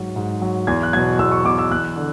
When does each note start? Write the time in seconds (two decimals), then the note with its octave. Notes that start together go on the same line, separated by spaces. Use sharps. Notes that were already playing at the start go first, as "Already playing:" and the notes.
Already playing: G#2 F#3
0.16 G#2
0.42 F#3
0.67 E2 G#6
0.83 F#6
0.93 B2 F#3 G#6
1.19 E2 E6
1.32 C#6
1.44 B2 F#3 D6
1.59 E6
1.71 E2 F#6
1.96 D3